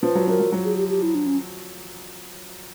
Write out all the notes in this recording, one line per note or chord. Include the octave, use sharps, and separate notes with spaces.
F3 B4
F#3
F#3 A#4
F#3
F#3
G#4
G4
G4
E4
D4
C#4